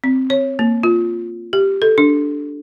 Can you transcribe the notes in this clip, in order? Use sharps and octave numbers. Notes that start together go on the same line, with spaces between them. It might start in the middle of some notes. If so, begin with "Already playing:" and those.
C4
C#5
A#3
F4
G4
A4
D4